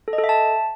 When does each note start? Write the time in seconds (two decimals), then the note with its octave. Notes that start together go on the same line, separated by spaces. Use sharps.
0.08 A4
0.13 D#5
0.18 A4
0.24 E5
0.29 A5